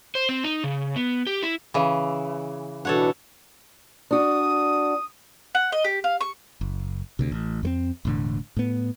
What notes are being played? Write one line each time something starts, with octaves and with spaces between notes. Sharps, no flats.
C5
C4
D#4
C#3
B3
G4
E4
C#3 E3
B2 E3 D4 A4 C#5 F#5
D4 F#4 D#6
F#5
D#5
G4
F5
C#6
F#1
D2 C3
A1
F2 G#3 C4
E1 A2 D3
A2 B3